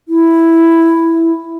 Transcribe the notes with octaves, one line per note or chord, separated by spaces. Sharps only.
E4